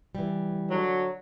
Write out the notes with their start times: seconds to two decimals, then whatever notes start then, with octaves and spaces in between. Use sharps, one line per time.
0.15 E3 G3
0.70 D3 F#3